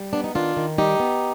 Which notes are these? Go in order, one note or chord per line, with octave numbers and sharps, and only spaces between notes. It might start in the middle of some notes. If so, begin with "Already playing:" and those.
Already playing: G3
B3 D4
D#4
D#3 D4 F4
D#3
G3 D#4 G4
B3